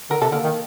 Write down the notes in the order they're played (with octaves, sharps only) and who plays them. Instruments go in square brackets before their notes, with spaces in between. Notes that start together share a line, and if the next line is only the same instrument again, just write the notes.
[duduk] D3 [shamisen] A#4
[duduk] C3 [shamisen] A4
[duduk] D3 [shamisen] A#3
[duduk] D#3